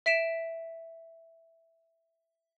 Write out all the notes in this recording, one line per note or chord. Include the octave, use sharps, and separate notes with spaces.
E5 B6 D7 E7